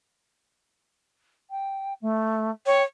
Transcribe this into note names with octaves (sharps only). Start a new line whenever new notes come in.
G5
A3
C#5 G5